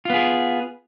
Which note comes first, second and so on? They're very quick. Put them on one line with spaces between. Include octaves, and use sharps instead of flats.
F4 B3 G#4